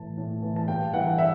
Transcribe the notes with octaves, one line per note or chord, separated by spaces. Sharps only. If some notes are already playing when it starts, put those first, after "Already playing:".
Already playing: A2 E3 A5
A2
E3
A5
G2 G5
E3 F#5
E5